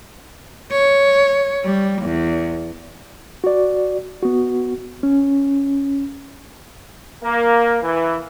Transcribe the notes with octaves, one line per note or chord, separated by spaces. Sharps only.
C#5
G3
E2
F#4 D5
B3 F#4
C#4
A#3
E3